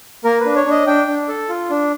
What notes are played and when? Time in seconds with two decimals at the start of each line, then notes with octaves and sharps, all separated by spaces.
0.24 A#3 A#4
0.40 B4
0.46 D4
0.56 C#5
0.66 D4
0.71 D#5
0.87 D4 G5
1.07 D4
1.28 A4
1.49 F4
1.70 D4